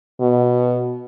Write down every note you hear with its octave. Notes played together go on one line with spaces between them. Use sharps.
B2